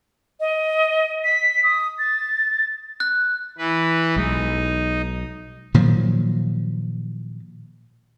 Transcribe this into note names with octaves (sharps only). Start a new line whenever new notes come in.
D#5
B6
D#6
A6
F#6
E3 B4
B1 G#3 D#4
A#2 D#3 F3 F#3